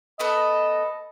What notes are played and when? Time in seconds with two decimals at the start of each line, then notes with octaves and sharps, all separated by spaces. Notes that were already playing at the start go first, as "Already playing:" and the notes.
0.20 A3 B3 A4 D#5